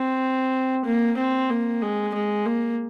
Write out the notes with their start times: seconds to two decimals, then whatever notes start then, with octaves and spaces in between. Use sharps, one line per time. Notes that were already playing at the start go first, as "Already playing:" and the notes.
Already playing: C4
0.85 A#3
1.18 C4
1.50 A#3
1.82 G#3
2.14 G#3
2.46 A#3